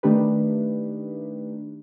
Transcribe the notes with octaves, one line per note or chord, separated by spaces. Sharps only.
D#3 A3 D4 D#4 G4 B4